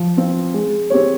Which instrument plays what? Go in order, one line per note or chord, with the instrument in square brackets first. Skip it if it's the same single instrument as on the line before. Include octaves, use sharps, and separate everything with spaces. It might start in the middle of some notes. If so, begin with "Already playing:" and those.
Already playing: [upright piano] F3
C4 F4
G#3
C4 G4 C#5